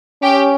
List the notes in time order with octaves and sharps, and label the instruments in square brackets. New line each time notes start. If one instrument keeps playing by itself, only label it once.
[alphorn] C#4 [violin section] G4